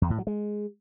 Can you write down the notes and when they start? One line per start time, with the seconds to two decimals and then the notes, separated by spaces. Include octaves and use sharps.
0.02 E2
0.10 A2
0.18 F#3
0.27 G#3